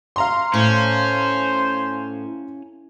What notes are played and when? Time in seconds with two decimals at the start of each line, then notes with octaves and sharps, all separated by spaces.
0.16 F5 A#5 C6
0.54 A2 C#4 C5